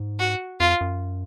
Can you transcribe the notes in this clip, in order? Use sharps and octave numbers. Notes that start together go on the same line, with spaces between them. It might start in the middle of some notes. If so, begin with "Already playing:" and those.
Already playing: G#2
F#4
F2 F4
F#2